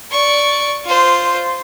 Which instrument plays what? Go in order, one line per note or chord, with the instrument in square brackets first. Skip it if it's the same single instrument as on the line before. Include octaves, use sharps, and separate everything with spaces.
[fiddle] D5 C#6
F4 C5